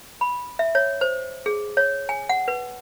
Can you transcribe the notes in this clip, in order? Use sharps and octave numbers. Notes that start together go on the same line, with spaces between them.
B5
E5
C#5
C5
G#4
C#5
G#5
F#5
B4